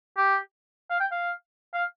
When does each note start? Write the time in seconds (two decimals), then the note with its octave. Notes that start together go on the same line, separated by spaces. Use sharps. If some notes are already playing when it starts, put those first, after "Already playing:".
0.17 G4
0.90 F5
1.00 G5
1.12 F5
1.74 F5